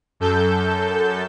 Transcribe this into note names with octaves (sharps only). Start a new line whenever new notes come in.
F#2 A4 G6